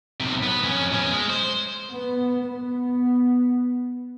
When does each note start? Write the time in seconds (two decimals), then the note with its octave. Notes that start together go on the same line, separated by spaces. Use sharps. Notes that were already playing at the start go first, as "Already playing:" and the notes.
0.20 B1 C3
0.43 B3 B4
0.64 F2 C#4
0.92 B2 C#4
1.13 G#3
1.30 C5
1.89 B3
2.45 B3